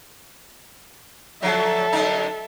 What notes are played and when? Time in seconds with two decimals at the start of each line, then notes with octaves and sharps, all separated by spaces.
1.42 D3 F3 F#3 A4 E5
1.93 F#2 D3 D#4